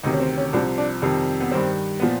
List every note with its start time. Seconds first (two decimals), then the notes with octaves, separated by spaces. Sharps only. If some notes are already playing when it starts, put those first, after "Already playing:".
0.03 D2 C3 D#3 D#4
0.13 C#4
0.20 C4
0.37 C#4
0.53 C2 C3 F3 D4
0.78 D4
1.02 F2 C3 D#3 G3
1.40 B3
1.51 G2 D#3 G3 C4
2.00 A#2 F3 B3